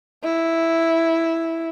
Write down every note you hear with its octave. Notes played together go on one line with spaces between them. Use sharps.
E4